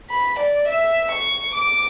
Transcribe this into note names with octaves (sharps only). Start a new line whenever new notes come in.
B5
D5
E5
C#6
D6